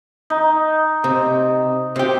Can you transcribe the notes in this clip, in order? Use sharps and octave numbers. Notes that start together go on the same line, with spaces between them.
D#4
C3
C3 G4